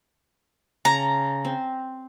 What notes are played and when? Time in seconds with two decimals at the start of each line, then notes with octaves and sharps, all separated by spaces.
0.85 C#3 A5 A#5 C#6
1.45 C4